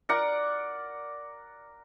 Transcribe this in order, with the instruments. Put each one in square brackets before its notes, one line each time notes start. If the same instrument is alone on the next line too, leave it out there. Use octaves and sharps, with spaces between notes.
[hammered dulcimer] A#4 D5 F#5